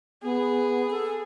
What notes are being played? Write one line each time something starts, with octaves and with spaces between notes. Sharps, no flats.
B3 G#4
A4